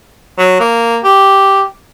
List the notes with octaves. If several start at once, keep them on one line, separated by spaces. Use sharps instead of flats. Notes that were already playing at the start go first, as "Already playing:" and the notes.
F#3
A#3
G4